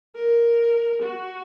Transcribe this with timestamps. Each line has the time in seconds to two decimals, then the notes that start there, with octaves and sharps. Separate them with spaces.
0.15 A#4
1.02 F#4